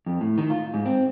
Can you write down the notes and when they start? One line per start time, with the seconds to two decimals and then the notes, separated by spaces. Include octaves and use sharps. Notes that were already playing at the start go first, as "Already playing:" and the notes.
0.06 F2
0.21 A2
0.38 D#3
0.50 F4
0.74 G#2
0.86 C4